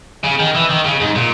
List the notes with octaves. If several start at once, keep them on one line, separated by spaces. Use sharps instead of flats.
C#3
D#3
E3
D#3
C#3
G#2
A#2